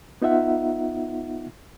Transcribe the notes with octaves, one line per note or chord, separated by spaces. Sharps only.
B3 D#4 F4 E5 F#5